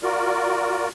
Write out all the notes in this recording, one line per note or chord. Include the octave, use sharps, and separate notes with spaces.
F4 F#4 A#4 D5